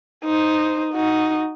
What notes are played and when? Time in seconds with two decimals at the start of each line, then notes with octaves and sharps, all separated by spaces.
0.25 D#4 C5
0.94 D#4 F#4